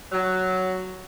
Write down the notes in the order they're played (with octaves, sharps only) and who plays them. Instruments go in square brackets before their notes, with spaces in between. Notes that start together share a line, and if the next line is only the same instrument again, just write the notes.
[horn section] F#3